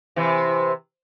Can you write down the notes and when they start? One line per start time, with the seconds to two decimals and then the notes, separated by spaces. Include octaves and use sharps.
0.16 C3 E3